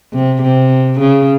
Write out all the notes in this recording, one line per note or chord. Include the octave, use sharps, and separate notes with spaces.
C3
C3
C#3